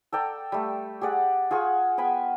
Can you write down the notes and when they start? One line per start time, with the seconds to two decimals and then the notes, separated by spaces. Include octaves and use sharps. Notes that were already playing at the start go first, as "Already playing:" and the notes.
0.12 A4 D5 G5 A#5
0.52 G3 A3
1.01 G4 G#4 D5 F#5
1.51 F4 G#4 F#5 C#6
1.98 B3 G5 G#5 B5